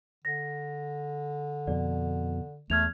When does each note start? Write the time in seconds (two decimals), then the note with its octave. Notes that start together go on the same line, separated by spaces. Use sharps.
0.25 D3 A#6
1.67 F2 B2 D5
2.70 E2 A3 F6 G#6 F7